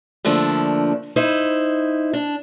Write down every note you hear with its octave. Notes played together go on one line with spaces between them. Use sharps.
D3 F3 A3 A#3 D4
D#4 E4 C5
D4